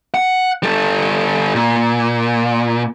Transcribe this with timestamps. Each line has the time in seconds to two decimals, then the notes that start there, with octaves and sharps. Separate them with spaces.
0.14 F#5
0.63 G3 A4
1.55 A#2